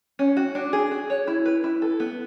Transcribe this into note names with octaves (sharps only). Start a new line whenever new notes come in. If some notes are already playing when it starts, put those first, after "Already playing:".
C#4
F#4
D4
G#4
F#4
C#5
E4
B4
E4
A4
B3